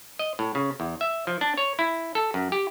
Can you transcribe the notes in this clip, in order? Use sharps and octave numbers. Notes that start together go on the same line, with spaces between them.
D#5
A2
C#3
E2
E5
F3
D4
C#5
E4
A4
F#2
G4